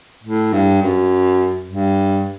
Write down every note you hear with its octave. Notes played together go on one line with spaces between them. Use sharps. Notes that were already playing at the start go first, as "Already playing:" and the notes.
A2
G2
F#2
G2